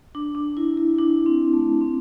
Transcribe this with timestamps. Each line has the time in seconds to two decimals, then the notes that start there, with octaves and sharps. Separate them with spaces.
0.15 D4
0.35 D4
0.57 E4
0.77 E4
0.99 D4
1.26 C4
1.53 A3
1.81 C4